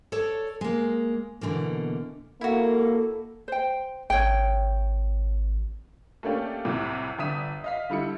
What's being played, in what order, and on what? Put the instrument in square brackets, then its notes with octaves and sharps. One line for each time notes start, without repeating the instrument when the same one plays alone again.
[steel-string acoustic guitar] A4 C#5 D5 A5
G#3 A#3
B2 D3 E3 A#3
[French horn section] A#3 [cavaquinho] E4 F#4 [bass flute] A4
[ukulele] C5 G5
[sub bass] G#1 [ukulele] C#5 G5
[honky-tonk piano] A3 A#3 C#4 D4 G4
C2 A2 C3
G1 D4 E5 D#6 B6 D#7
D#5 F5 B6
D3 G3 E4 C#7